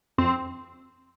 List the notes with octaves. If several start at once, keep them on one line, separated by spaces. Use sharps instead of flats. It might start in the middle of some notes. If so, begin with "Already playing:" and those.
F2 C4